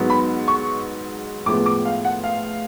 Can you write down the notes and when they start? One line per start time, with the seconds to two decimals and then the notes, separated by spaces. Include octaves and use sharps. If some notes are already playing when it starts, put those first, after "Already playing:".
Already playing: G#2 F#3 B3
0.10 B5
0.48 C#6
1.46 A2 F3 G#3 B3 D6
1.66 D6
1.85 F5
2.05 F#5
2.24 F5